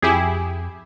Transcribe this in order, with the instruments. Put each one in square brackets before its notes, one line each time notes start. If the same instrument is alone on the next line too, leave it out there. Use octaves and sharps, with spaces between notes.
[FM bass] F2 [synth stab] E4 G4 G#4